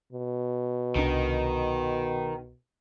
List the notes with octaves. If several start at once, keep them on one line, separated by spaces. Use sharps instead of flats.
B2
C2 D#3 D4